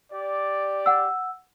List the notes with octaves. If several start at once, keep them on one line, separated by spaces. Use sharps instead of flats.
G4 D5
F#5 E6